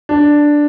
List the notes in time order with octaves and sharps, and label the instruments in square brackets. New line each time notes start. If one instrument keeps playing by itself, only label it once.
[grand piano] D4